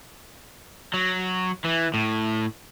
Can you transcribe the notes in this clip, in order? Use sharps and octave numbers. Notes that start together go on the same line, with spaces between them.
F#3
E3
A2